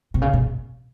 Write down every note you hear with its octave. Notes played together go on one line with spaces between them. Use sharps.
C3
C#3
B2